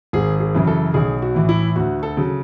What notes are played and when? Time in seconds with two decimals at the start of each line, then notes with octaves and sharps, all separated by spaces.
0.13 G#1 G#4
0.40 G#4
0.54 F#2 C#3 E3
0.67 A4
0.94 B1 G#4
1.22 F#4
1.35 A2 E3
1.49 E4
1.76 D2 F#4
2.03 A4
2.17 C#3 F#3